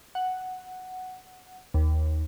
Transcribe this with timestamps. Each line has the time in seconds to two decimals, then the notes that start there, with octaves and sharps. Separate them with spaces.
0.15 F#5
1.74 D#2